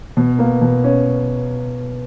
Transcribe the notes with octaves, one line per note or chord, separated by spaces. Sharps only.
B2
A#3
B2
C#4